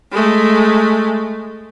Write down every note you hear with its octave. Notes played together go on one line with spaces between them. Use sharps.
G#3 A3